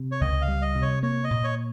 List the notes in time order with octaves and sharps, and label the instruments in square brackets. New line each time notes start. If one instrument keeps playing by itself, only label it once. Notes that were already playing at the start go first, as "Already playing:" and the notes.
Already playing: [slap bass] C3
[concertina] C#5
[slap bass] C#2 [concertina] D#5
[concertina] F5
[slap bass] G3
[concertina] D#5
[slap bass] C3
[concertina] C#5
[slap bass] A#3 [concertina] C#5
[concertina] D#5
[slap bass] A#2
[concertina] C#5